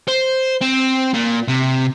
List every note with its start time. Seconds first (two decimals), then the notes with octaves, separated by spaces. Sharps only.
0.08 C5
0.61 C4
1.13 A#2
1.48 C3